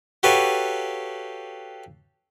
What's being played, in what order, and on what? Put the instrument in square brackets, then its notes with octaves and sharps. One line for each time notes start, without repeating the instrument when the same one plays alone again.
[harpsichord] F#4 G4 A4 B4 C#5 F5